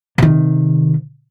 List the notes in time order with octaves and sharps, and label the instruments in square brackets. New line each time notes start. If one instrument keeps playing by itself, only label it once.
[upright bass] C3 D#3